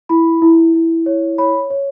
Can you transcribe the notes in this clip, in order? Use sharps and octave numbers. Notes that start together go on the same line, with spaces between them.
E4 B5
E4
E4
C#5
C#5 B5
C#5